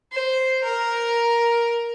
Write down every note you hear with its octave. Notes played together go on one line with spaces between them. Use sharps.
C5
A#4